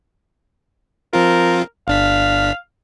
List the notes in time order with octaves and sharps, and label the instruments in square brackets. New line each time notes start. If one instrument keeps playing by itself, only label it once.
[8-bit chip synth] F3 C4 F4 [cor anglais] A#4
[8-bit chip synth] G1 D4 B6 [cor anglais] F5